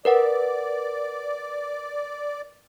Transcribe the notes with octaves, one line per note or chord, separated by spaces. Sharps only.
A#4 B4 D5 F#5